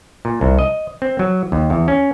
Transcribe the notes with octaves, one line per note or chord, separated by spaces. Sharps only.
A#2
C2
D#5
C4
F#3
D#2
E2
C#4